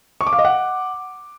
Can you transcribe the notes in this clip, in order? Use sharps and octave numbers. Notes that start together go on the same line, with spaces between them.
C#6
D6
F5
D#5
F#5